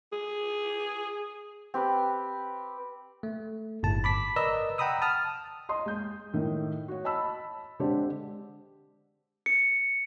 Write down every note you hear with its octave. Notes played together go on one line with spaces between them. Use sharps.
G#4
C4 G4 B4
A3
G1 A2 A5
B5 D6 B6
A#4 B4 D5 D#5 A#5 E6
F#5 G5 A#5 B5 D#6 E6
A5 D#6 F6
D#5 C6 D#6
G#3 G6
A2 D#3
F#4 C#5
D#5 A5 B5 E6
D3 G#3 C4 D4 G4 C5
C#7